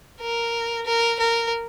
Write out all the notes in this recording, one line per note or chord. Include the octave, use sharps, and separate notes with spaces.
A#4
A#4
A#4